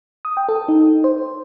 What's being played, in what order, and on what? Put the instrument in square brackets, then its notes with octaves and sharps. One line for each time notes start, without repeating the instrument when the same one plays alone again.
[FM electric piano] D#6
G5
A4
D#4
C5